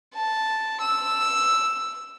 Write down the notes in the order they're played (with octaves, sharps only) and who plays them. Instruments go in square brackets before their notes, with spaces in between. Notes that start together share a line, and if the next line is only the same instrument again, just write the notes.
[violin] A5
E6